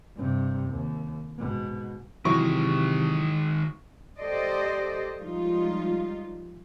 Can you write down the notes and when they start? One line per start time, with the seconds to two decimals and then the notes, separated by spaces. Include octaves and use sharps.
0.16 G2 C3
0.71 D#2
1.38 G#2 B2
2.25 C3 D#3 E3 F#3 G#3 E4 C#6
4.18 G4 A4 C5 D5 D#5
5.17 F3 G3 G#3 D#4 F4